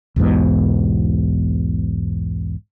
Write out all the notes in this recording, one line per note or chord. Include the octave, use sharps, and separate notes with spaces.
B1 E2 G#2 B2